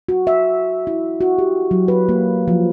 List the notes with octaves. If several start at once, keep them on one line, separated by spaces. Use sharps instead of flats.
F#4
E5
E4
F#4
G4
F#3
B4
A#3
F3